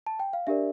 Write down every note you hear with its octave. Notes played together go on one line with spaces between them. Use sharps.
A5
G5
F5
D4 G4 A#4 D5 E5